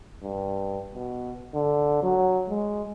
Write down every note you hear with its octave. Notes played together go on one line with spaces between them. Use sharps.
G2
B2
D3
F#3
G#3